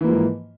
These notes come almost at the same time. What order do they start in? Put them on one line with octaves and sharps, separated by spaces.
E3 A#3 F3 G#2